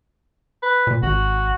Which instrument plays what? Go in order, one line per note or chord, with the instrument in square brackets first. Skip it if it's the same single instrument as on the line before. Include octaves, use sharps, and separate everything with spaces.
[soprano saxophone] B4
[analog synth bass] A#2
[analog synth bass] G#1 [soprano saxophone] F#4